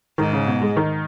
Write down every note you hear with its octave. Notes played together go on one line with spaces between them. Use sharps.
G#2 D#3
C#3
B2
G#3
D#3